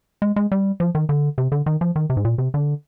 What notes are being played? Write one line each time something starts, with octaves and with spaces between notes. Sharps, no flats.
G#3
G#3
G3
F3
D#3
D3
C3
D3
D#3
F3
D#3
C3
G#2
A#2
C3
D3